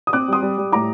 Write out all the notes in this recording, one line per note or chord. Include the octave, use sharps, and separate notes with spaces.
D#6
C4 D6 F#6
G3 C6 D#6
G3
G3
A2 A#5 D6